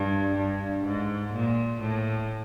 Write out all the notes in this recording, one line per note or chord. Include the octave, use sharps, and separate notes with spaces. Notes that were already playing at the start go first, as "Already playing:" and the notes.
Already playing: G2
G2
G#2
A#2
A2